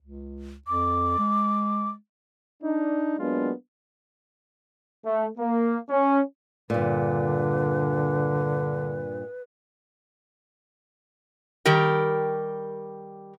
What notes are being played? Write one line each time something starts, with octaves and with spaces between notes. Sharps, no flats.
C#2
F2 D6
G#3
D4 D#4
F#3 G#3 A#3 B3 D4 F4
A3
A#3
C#4
G2 A#2 D3 B4
D#3 G3 G4 A#4